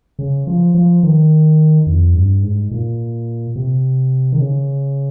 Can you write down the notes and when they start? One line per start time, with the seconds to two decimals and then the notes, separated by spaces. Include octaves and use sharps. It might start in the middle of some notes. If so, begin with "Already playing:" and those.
0.19 C#3
0.47 F3
0.75 F3
1.03 D#3
1.87 F2
2.15 G2
2.43 G#2
2.71 A#2
3.56 C3
4.32 D#3
4.39 C#3